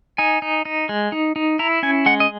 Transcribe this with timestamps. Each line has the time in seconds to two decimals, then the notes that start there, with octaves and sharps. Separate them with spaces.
0.18 D#4 G#5
0.42 D#4
0.65 D#4
0.89 G#3
1.12 D#4
1.36 D#4
1.59 E4 A#5
1.83 C#4 G#5
2.06 G#3 F#5
2.20 D#5